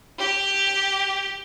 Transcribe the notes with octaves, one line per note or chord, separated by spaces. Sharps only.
G4